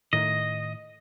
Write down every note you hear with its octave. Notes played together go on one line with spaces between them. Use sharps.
A2 D#3 D#5